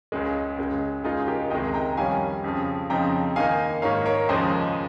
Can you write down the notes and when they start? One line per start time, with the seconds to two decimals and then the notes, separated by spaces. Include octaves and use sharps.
0.12 C#2 C#3 G#3
0.59 C#2 C#3 G#3
1.04 C#3 G#3 D#4 F4 G#4
1.28 G4 A#4
1.50 C#2 C3 D#3 G#3 D#5 G5
1.74 G5 A#5
1.97 F2 D#3 G3 C#4 F5 G#5
2.44 F2 C#3 F3
2.90 F2 C#3 F3 C4 D#4 G5 A#5
3.36 D#2 D#3 A#3 D#4 F5 G#5
3.82 G#2 D#3 A#3 C#5 F5
4.06 A#4 C#5
4.29 D#2 C#3 F3 G#3 C5 D#5